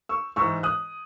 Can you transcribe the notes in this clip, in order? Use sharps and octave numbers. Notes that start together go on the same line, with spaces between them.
C#6 E6
G#2 E3 C#6 E6
D#6 F#6